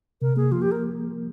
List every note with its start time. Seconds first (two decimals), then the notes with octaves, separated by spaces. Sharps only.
0.22 C3 A#4
0.36 A#3 G#4
0.52 F3 F4
0.62 G4
0.72 A#4